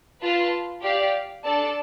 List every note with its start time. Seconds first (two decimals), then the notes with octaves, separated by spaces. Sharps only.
0.21 F4 B4 F5 A5
0.83 G4 D5 F5
1.44 D4 A4 D5 A5